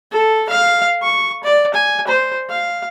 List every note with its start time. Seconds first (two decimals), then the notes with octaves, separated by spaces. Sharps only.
0.11 A4
0.49 F5
1.03 C#6
1.44 D5
1.74 G#5
2.07 C5
2.50 F5